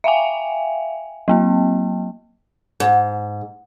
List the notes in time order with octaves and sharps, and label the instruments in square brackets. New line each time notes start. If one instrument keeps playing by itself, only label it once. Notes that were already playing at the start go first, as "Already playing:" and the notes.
[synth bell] E5 F5 G5 G#5
F#3 A#3 C4
[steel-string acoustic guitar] G#2